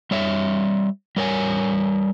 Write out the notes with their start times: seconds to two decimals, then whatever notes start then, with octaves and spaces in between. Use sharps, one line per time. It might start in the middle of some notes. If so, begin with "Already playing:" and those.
0.11 G3 C#5 E5
1.17 G3 A#4 C#5 G#5